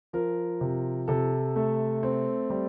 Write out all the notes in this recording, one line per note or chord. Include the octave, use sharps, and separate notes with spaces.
F3 A#4
C3
C3 A4
A3
C4
G3